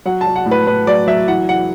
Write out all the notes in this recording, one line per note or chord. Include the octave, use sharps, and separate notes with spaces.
F#3 F#5
A5
F#3
F#5
A2
B4
A2 B4
F#3 D5
F#3 E5
E3 F#5
E3 F#5